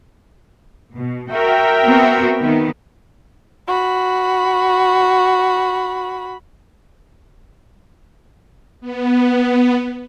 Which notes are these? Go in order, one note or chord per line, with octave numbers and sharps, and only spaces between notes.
B2
F#4 A#4 E5 G5
B3 C4 F#4
D#3 B3
F#4 B5
B3